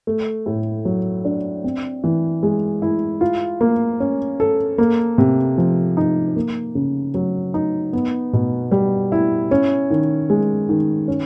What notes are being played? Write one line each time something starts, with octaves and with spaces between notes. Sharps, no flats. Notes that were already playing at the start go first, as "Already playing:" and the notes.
A3
A2
F#3
D4
C4
E3
G#3
E4
F4
A#3
C#4
A4
A#3
C3
F3
D#4
A#3
C#3
F#3
D#4
B3
B2
G3
E4
C#4
D#3
G#3
D#3
C#4